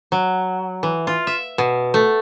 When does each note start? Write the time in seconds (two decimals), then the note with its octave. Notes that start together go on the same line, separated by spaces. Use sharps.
0.12 F#3
0.83 E3
1.07 F4
1.27 E5
1.58 B2
1.94 A3